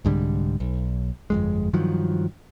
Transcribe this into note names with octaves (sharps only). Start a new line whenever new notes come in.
C2 G#2 D3 G3
B1
G1 F2 G#3
G2 D#3 F3 F#3